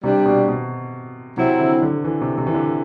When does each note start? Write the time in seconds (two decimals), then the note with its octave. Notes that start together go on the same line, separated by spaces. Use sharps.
0.03 C3 G3 D4 G4
0.26 B2
0.48 B2
1.37 C3 F#3 C4 E4
1.60 D3
1.82 D3
2.05 E3
2.21 C3
2.38 C3
2.47 E3
2.54 D3